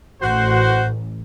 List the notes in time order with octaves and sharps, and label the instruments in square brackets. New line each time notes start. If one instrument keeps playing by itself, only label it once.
[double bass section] A1 [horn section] F#4 C5